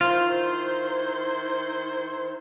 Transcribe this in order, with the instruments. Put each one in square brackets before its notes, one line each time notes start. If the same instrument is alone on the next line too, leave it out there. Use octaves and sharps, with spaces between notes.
[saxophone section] D#3 E4 C5 [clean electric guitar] F4